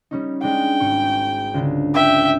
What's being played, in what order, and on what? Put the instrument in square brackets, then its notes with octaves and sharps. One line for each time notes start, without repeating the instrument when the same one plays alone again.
[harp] G3 C#4 D#4
[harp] G#3 D4 D#4 [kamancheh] G5
[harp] G#1 C#6
C#2 D3
[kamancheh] E5 G5